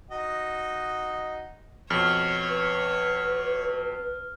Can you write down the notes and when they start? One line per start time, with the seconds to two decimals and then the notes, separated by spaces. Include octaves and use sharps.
0.11 D#4 F#4 D#5
1.90 F2 B2 C#5 F6
2.49 B4